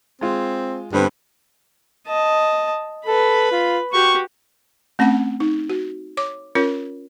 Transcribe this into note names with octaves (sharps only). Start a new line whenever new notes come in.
G#3 C4 F4
G2 D3 B3 C4
D#5 A5
A4 B4 B5
F4
F#4 G4 C#6
A3 C4 C#4 F#5
D#4
F#4
C#5 D6
C#4 F4 A#4 C#5